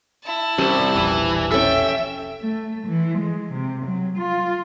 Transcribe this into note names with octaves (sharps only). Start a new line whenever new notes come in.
E4 A5
C2 G3 C#4 C5
E1 A#1 E3
C#4 A4 E5 G5
A3
E3
G#3
C3
F#3
F4